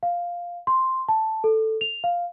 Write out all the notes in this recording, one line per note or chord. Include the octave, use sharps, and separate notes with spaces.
F5
C6
A5
A4
F7
F5